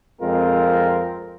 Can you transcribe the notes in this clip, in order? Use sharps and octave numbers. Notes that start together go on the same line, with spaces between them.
F2 G#3 C4 F4 A#4